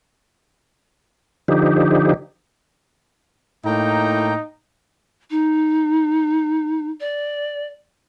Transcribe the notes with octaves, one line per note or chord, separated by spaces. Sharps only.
D3 F3 D#4 G4
A2 A#3 D#4 G5 A#5
D#4
D5